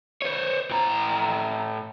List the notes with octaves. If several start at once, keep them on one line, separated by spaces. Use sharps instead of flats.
C5 C#5
A2 A#5